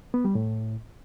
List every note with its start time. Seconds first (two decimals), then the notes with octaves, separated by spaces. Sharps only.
0.14 B3
0.25 G3
0.35 A2